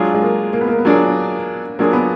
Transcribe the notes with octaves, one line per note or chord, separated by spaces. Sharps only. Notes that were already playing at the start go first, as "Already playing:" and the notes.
Already playing: F#3 G#3 D4 F4 G#4
G#3
A#3
A#3
B3
A#3
B3
F#3 A#3 D4 F4 G#4
F#3 A#3 D4 F4 G#4
B3